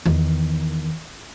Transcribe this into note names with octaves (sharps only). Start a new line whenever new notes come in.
E2 D#3